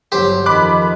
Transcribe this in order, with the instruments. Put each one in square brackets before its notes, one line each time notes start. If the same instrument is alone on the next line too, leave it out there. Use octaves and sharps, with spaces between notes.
[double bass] G1 F#3 [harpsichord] G4 C5
[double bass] F2 D#3 [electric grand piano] B5 D6 F#6